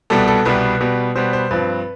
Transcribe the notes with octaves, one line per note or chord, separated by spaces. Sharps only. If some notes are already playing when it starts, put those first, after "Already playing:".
C2 B2 G3 B3 A4
A4
C2 B2 G3 B3 B4
B2 G3 B3
B2 G3 B3 C5
C5
G2 F3 C4 B4